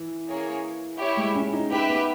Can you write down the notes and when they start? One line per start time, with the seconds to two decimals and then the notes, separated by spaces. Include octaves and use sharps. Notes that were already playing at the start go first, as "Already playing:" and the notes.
Already playing: E3
0.27 A#3 C#4 G#4 C#5
0.99 E4 G4 C#5 E5
1.17 G#3
1.35 C#4
1.53 D#4
1.71 D#4 G4 B4 E5
1.89 B3